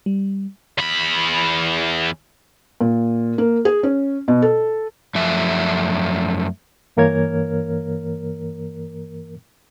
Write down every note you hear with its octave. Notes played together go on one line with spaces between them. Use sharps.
G3
E2 B5
A#2
A#3
G#4
C#4
B2
A4
F#2 F3 A3 E5
G2 E3 A#3 A#4 C#5 G#6